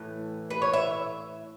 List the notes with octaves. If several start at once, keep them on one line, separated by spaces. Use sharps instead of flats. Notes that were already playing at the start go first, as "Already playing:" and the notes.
Already playing: A2 E3
B4
C#5
E5